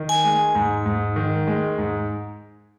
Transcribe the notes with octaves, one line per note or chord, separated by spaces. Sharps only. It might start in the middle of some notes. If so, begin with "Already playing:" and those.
Already playing: D#3
G#5
G#3
G#2
G#2
D#3
G#3
G#2